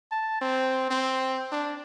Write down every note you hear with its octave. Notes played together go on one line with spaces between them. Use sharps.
A5
C4
C4
D4